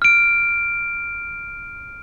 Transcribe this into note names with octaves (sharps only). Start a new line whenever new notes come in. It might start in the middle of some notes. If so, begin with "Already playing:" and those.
F6 D7